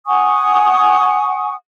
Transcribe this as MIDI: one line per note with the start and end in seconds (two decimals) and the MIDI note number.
0.07 1.53 78
0.07 1.53 80
0.07 1.53 85
0.07 1.53 87